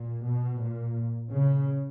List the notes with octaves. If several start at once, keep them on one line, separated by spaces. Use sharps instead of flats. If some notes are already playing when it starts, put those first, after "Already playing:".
Already playing: A#2
B2
A#2
C#3